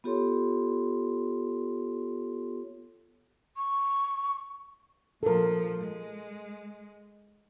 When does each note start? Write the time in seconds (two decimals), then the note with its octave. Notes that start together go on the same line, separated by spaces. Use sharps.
0.04 B3 F4 G4 A4 C#5 C6
3.57 C#6
5.23 A#2 F3 A4 A#4
5.83 G#3